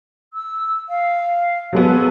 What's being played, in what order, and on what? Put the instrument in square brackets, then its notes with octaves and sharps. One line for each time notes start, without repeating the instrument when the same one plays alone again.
[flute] E6
F5
[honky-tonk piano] F#3 G#3 B3 [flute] A4